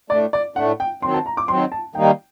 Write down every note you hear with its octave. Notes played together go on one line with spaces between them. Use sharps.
A2 A3 D4 D5
D5
A2 A3 D4 F#5
G5
D#3 F#3 C4 C6
A5
A#5
D6
D#3 F#3 C4 C6
A5
D#3 G3 A#3 D#4 G5